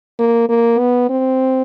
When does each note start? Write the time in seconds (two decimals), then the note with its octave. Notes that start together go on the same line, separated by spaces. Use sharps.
0.19 A#3
0.49 A#3
0.79 B3
1.10 C4